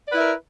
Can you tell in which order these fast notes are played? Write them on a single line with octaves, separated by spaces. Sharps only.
D5 B4 E4 E5 A#4